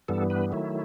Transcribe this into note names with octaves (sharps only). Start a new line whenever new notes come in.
G2 E3 G3 B3 A4
B4
D#3 F#3 A3 E4